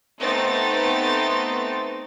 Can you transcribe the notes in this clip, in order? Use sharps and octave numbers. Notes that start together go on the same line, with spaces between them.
A3 B3 C4 D#4 A6